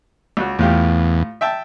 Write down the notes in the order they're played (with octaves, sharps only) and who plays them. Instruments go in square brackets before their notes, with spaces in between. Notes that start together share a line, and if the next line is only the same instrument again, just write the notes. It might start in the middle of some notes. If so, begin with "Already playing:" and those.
[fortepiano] C#2 F#4
[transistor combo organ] E2 [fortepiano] A2 F4 G4
[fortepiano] E5 G5 A5